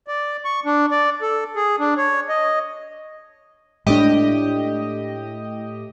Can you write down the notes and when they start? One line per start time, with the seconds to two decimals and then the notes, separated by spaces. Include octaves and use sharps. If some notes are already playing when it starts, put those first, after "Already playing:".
0.08 D5
0.45 C#6
0.66 D4
0.91 D5
1.22 A4
1.56 G#4
1.80 D4
1.97 C#5
2.29 D#5
3.87 A2 G#3 A3 D4 G4 D#5